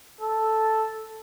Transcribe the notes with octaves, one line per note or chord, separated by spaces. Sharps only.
A4